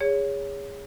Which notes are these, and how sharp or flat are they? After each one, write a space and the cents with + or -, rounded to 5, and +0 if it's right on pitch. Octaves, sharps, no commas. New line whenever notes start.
G#4 -25 C#5 +15